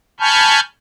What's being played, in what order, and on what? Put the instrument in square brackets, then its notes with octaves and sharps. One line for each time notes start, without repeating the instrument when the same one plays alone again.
[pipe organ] G#5 A5 B5 C#6 F6 G6